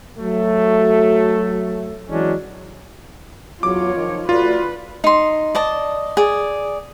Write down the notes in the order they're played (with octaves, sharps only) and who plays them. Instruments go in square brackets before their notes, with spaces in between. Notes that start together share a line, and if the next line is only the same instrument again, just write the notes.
[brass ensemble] F#3 A3
E3 F#3 G#3 C#4 D4
[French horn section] E2 F#3 [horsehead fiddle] F4 C#5 [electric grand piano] D6
[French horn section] D#3 F3 D#4
[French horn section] A3 F#4 D5 [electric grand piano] F4 [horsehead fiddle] B4
[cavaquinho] D#4 C6
D5 D#5 A5
G#4 D5